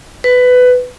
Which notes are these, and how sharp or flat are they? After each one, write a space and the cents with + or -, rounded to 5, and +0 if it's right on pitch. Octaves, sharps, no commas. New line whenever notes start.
B4 +15